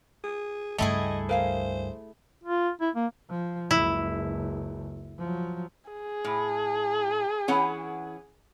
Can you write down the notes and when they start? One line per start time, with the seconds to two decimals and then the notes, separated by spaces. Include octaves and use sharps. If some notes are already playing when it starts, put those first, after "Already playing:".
0.24 G#4
0.78 C#2 G2 A3 E4 G#4 D#5 G5
1.29 A#4 C5 F5 G#5
2.43 F4
2.81 E4
2.95 A#3
3.30 F3
3.71 F#1 C#2 E4
5.19 F3 F#3
5.90 G#4
6.25 A2
7.48 E3 C#4 F#5